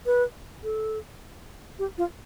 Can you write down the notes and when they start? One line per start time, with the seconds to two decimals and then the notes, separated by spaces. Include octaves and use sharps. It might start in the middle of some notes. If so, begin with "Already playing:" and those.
0.06 B4
0.64 A4
1.79 G4
1.98 F4